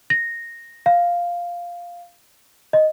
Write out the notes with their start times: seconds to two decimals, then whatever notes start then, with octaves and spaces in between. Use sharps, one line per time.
0.10 A#6
0.86 F5
2.73 D#5